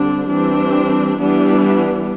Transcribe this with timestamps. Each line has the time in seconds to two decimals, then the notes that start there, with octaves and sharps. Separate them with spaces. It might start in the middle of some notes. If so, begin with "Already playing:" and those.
Already playing: D3 G3 C4 D4
0.30 E3 G3 C4 D4
1.20 E3 G3 B3 D4